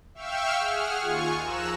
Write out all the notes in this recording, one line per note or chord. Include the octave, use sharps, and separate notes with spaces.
E5 F5 G5 C#6 E6 F6
G#4 F#5 F6
D#2 F4 G#5 C#6
F3 A#5 E6 F#6 E7